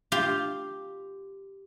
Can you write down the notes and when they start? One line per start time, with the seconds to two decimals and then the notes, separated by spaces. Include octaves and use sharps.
0.12 F4 G4